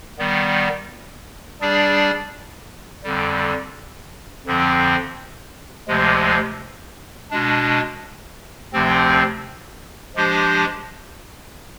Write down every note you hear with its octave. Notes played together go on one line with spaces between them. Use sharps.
D#3 G3 B3
G3 D4 G#4 D5
F2 D3 G3
F2 D3 F3 C4
D2 C3 F3 G#3
B2 G#3 D4
D2 C3 F3 C4
F3 G#3 D4 G4 C5